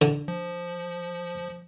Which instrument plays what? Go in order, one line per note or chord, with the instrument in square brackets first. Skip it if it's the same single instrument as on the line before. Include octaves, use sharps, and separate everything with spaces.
[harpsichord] D3
[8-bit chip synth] F3